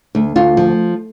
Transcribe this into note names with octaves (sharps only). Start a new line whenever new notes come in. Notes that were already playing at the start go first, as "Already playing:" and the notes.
D2
D2 F4
F3